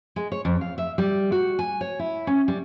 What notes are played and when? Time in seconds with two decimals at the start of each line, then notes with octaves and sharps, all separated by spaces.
0.16 G#3
0.32 C#5
0.45 F2
0.61 F5
0.78 E5
0.98 G3
1.32 F#4
1.59 G#5
1.81 C#5
1.99 E4
2.27 C#4
2.48 G3